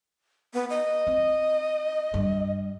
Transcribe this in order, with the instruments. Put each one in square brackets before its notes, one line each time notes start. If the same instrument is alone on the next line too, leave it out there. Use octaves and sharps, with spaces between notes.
[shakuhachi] B3
D#5
[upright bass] C4
G2 G3